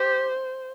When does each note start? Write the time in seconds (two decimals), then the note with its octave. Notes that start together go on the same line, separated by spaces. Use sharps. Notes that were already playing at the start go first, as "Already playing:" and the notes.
Already playing: G4 C5